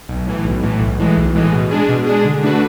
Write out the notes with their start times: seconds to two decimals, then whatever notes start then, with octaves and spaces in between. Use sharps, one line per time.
0.09 B1
0.27 A2 E3
0.44 B1
0.63 A2 E3
0.80 B1
0.99 A2 E3 G#3
1.17 B1
1.35 A2 E3 G#3
1.52 B2
1.71 G#3 D4 G#4
1.89 B2
2.06 G#3 D4 G#4
2.25 D3
2.43 A3 D4 F#4 B4